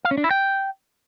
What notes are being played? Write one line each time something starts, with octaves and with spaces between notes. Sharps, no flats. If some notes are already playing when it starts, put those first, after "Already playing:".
F5
C#4
D4
E4
G5